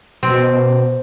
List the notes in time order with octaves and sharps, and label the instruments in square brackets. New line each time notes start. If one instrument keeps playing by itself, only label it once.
[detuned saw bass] B2 [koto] C4